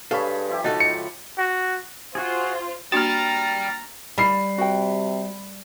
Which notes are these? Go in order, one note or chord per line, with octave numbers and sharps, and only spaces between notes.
G2 G#4 A4 C#5 F5 B5
F3 E4 G4
C#2 D#4 F#4 A4 A5
C#7
F#4
F4 F#4 G#4 C5
A#3 D4 F#4 D5 G5 A#5 F6 A6
G3 B5 C7
C3 F#4 G5